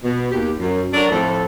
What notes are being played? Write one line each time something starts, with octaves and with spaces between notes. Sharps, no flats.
B2
D#2 G4
F#2
F#3 D4 F#4 A4 A#4
F2 A2 E4 A4